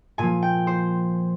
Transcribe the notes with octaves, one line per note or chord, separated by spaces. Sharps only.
A#2 F3 G#5
G5
C5